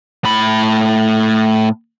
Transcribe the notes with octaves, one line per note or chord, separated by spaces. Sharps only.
A2 B5